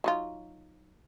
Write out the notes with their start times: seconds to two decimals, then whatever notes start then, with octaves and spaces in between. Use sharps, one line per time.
0.04 F#3 D#4 F4